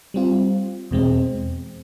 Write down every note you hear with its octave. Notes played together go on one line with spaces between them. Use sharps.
G3 C4 F4
E2 B2 G#3 C4